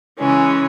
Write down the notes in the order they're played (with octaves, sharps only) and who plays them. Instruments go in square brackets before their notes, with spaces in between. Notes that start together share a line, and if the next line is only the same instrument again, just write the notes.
[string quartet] C#3 E3 G#3 C#4